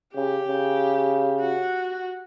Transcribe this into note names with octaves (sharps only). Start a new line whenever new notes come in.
C#3 G4
C#3
F#4